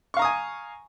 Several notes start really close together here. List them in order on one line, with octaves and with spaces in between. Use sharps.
C#6 F5 A#5 D#6 G#5